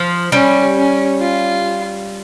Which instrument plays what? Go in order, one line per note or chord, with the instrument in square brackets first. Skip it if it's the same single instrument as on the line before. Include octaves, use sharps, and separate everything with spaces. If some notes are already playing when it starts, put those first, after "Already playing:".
Already playing: [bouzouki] F3
[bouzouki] G3 [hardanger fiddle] C#4
[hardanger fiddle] C#4
F4